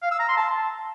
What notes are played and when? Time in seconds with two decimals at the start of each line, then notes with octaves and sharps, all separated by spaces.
0.02 F5
0.11 E6
0.20 A#5
0.28 C6
0.37 A5